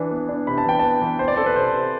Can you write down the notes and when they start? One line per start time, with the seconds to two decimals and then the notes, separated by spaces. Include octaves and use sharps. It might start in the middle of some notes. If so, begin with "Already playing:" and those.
Already playing: E3 D4
0.11 B3
0.29 D4
0.47 C3 B5
0.58 A5
0.65 E3 G5
0.79 B3 A5
1.01 E3
1.19 C4 C5
1.28 D5
1.37 C4 A4
1.46 B4
1.55 C3 C5
1.73 C3